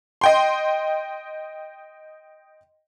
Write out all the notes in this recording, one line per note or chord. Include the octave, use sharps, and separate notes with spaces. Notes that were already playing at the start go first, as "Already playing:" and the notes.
D#5 G5 C6